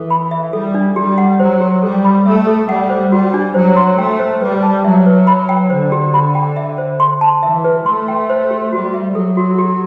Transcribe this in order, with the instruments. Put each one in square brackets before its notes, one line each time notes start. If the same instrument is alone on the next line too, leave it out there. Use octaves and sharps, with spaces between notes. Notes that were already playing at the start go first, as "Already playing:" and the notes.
Already playing: [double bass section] E3 [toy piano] A4
[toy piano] B5
E5
[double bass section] G3 [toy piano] A4
[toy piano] D4
[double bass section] G3 [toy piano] G4
[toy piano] F#5
[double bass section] F#3 [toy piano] C5
[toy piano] G4
[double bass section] G3 [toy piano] A4
[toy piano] B5
[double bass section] A3 [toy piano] E5
[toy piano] A4
[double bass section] G3 [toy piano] F#5
[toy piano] C5
[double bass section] G3 [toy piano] F#4
[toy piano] D4
[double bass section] F#3 [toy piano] C5
[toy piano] C6
[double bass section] A3 [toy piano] G5
[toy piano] C5
[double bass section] G3 [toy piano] B4
[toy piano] A5
[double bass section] F#3 [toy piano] E5
[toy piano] B4
B5
G5
[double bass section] D3 [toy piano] C5
[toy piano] G4
B5
G5
E5
C5
C6
A5
[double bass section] E3 [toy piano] E5
[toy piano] B4
[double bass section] A3 [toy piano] C6
[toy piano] G5
C5
G4
[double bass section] G3 [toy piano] F#4
[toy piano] E5
[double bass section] F#3 [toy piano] A4
[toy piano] F#4
G4